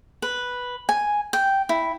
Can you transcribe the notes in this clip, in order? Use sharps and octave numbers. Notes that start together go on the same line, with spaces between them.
B4
G#5
G5
E4